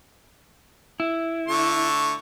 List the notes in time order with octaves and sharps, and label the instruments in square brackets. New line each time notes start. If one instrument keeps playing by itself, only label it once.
[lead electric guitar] E4
[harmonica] D3 A3 C#6